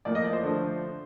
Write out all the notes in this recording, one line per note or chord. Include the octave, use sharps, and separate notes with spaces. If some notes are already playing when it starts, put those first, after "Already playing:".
A2 F3 A#3 D5
D#5
D5
C5
D3 F3 A3